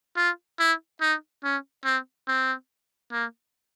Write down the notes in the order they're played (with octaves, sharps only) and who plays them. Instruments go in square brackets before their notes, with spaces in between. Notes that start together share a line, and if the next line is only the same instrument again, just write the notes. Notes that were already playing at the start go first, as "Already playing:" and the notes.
[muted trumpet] F4
E4
D#4
C#4
C4
C4
A#3